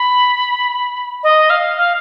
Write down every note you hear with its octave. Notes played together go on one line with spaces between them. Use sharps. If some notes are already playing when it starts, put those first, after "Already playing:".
Already playing: B5
D#5
F5
F5